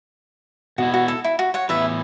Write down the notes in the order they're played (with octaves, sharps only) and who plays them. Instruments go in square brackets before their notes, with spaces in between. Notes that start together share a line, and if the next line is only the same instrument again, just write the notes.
[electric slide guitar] B2 B3 E4 [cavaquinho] F#4
[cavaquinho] F#4
A4
E4
F#4
C#5 F#5
[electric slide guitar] A2 E3 B3 E4 [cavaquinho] B4 E5